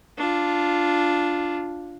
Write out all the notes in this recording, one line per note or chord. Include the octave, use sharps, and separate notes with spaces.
D4 F4